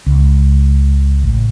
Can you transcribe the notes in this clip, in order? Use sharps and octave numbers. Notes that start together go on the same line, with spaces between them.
C#2
A1